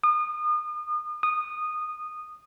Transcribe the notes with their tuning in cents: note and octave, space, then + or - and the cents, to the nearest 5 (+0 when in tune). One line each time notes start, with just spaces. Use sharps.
D#6 -35
D#6 -15